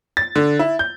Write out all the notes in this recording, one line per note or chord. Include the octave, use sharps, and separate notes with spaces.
A6
D3
E4
G6